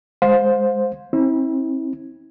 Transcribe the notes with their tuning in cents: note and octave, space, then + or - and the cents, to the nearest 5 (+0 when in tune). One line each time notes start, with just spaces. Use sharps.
G#3 +0 C5 +0 F5 +35
C4 +35 E4 -35